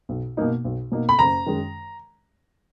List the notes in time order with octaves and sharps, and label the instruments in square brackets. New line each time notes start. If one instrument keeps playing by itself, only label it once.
[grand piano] B1
B2 A#3 D#4
B1
B2 A#3 D#4
[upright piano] B5
[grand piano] F#1 [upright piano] A#5
[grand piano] F#2 D#3 G#3